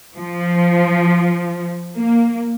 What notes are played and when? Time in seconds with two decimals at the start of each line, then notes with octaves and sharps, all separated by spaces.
0.17 F3
1.96 A#3